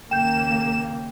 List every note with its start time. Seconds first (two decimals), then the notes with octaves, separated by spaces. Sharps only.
0.11 D#2 C#3 A#3 G5 G6 E7